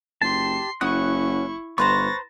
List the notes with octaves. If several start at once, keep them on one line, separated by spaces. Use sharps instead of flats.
F#1 G4 A5 C6 C7
F#1 C#4 E4 F#4 C#6 D#6 F#6
G1 B4 C5 A#5 C#6 F#6 A6 A#6